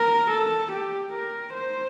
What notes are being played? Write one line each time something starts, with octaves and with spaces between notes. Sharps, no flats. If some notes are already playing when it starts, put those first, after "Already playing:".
Already playing: A#4
A4
G4
A#4
C5